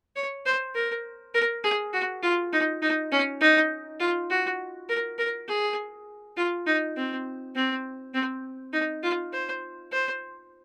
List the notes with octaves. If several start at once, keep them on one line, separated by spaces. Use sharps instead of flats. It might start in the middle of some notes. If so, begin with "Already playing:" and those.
C#5
C5
A#4
A#4
G#4
F#4
F4
D#4
D#4
C#4
D#4
F4
F#4
A#4
A#4
G#4
F4
D#4
C4
C4
C4
D#4
F4
C5
C5